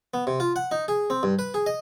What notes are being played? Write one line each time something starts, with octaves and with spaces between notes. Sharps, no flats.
B3
C3
F4
F#5
D#4
G#4
C4
G2
B4
G#4
D#5